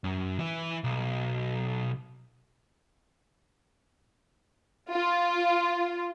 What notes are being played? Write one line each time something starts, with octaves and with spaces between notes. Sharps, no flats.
F#2
E3 E4
B1
F4